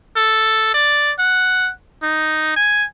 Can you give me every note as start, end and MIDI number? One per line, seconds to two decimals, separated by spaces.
0.16 0.70 69
0.74 1.12 74
1.19 1.71 78
2.03 2.55 63
2.56 2.84 80